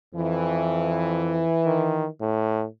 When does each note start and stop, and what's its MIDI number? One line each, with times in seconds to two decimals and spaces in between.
0.14 1.50 41
0.14 2.07 52
1.66 2.07 51
2.21 2.65 45